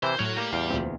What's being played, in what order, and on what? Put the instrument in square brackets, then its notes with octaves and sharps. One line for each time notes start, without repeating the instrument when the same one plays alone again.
[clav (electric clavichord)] C3 E3 E4 [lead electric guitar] C5
[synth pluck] A2 F6 [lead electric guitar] F#3 [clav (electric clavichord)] C#5
[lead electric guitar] G3 [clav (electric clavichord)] A#3
[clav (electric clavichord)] E2 F5
[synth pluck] D2 A#2 C4